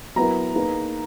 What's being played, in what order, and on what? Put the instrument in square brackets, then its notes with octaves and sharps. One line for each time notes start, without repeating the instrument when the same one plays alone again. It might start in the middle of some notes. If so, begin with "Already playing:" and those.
[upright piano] F#3 B3 E4 A#4 [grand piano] A#5
[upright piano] A#3 D#4 G#4 B4